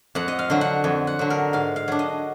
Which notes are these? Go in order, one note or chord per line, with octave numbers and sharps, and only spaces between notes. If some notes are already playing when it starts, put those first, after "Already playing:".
F2 F#5
D#5
F5
D3 F#3
F#5
F2
F#5
D3 F#3
A#4
G#2 F5
F5
F#3 D4
D#5